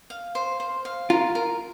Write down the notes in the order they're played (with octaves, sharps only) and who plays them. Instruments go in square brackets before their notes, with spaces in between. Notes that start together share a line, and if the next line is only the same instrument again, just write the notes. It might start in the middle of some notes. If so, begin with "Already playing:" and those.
[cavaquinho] F5
C5
C5
F5
[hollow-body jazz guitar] F4 [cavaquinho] A#4
[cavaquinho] A#4